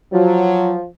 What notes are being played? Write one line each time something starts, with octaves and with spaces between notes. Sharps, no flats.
F3 F#3